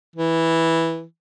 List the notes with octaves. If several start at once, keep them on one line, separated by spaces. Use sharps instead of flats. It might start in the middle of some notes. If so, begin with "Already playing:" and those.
E3